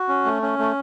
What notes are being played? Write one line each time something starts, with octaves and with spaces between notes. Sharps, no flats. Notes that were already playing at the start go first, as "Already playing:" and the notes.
Already playing: F#4
C#4
A3
C#4
A3